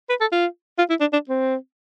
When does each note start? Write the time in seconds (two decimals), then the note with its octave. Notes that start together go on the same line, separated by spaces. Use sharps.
0.09 B4
0.20 A4
0.32 F4
0.78 F4
0.90 E4
1.00 D4
1.13 D4
1.29 C4